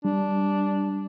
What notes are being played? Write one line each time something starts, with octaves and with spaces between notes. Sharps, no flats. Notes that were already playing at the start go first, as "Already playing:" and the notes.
G3 D4